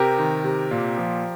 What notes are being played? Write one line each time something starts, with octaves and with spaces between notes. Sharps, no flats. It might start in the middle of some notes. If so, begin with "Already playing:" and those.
Already playing: C3 G4 A#4
D#3
C3
A#2
F3